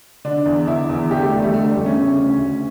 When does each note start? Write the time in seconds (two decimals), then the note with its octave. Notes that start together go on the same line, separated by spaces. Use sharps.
0.25 D3 D4
0.46 E2
0.67 D3 E4
0.89 E2
1.11 D3 G4
1.22 A3
1.32 E2 G3
1.42 A3
1.53 D3 A3
1.64 G3
1.75 E2 A3
1.86 C#4
1.97 C#3
2.19 D2
2.40 D2